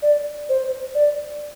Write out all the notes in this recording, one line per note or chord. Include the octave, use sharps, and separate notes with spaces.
D5
C5
D5